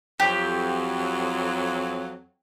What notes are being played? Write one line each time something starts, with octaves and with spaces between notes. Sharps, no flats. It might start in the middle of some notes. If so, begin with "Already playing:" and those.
F2 F#3 G4